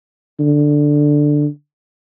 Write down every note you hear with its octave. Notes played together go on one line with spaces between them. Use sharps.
D3